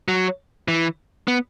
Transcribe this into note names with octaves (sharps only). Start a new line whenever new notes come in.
F#3
E3
B3